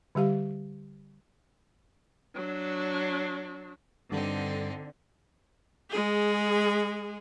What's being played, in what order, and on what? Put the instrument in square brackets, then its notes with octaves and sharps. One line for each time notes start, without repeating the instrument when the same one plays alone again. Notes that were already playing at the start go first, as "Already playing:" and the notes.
[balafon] D3 G3 G4 F5
[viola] F#3 D4
[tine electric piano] G2 [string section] D3 [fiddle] C4 D#4
[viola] G#3 G#4